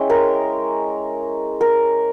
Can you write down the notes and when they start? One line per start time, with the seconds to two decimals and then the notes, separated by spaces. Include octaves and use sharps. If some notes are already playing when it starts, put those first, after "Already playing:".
Already playing: G#3 C#4 E4 G5
0.10 A#4
1.61 A#4